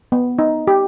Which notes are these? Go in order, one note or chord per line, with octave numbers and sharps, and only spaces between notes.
B3
D#4
G4